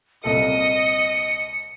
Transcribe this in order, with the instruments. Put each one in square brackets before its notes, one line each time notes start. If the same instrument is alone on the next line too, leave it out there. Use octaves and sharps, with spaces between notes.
[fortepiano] C2 A#2 A4 [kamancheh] D#5 [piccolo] C#7